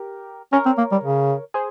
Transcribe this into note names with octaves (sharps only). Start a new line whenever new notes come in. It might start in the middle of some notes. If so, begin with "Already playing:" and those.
Already playing: G4 A#4
C#4 A#4 C#5
C4
A#3
G3
C#3
G#4 C5